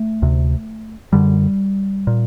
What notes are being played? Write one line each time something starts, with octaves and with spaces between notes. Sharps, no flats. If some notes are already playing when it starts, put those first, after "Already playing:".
Already playing: A3
D2 C3
F#2 D3 G3
A#2